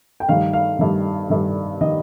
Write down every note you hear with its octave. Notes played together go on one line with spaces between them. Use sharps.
G5
G2 D#3 F5
F5
G2 D#3
G2 D#3
D#3 D#5